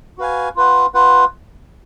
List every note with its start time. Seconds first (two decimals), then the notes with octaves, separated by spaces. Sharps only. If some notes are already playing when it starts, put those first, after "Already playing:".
0.18 F#4 B4 F5 G#5
0.56 F4 B4 F#5
0.94 F4 B4 F#5